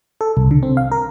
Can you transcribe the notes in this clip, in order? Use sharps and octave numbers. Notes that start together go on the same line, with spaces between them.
A4
C2
D3
C4
F5
A#4